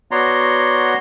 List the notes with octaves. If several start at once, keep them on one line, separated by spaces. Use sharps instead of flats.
B3 F#4 C#5 D5 A#5 C6